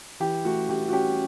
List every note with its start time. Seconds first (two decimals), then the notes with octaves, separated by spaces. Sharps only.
0.20 E3 G4
0.45 A3 F#4
0.69 E3 G4
0.88 F#4
0.93 C#4 G4